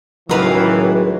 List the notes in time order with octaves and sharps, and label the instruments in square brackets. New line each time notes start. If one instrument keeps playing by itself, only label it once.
[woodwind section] C#2 D#3 [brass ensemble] A2 E3 [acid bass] F#3 [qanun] A#4 B4 F5